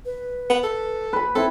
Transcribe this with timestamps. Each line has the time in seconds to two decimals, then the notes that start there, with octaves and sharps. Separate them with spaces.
0.05 B4
0.50 B3
0.64 A4
1.13 B4 B5
1.35 C4 E4 A4